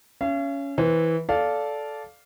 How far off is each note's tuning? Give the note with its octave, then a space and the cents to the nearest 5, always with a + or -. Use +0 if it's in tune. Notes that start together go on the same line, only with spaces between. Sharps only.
C#4 +15 F5 -45
E3 -15 C5 +0
A4 -10 D5 -10 F5 +0